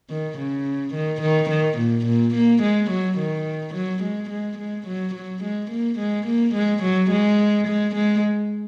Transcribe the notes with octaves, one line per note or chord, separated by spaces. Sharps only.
D#3
C#3
D#3
D#3
D#3
A#2
A#2
A#3
G#3
F#3
D#3
F#3
G#3
G#3
G#3
F#3
F#3
G#3
A#3
G#3
A#3
G#3
F#3
G#3
G#3
G#3